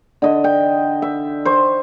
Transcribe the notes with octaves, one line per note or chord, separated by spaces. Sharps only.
D3 D#5
G5
E5
C5 C#6